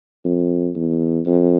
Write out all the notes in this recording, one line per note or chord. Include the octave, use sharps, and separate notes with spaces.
F2
E2
F2